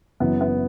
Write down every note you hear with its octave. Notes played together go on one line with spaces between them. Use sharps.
F#1 F#2 E3 B3
B3